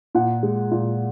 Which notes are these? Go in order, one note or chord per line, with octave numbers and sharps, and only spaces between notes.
A#2 F#5
G#3
A#2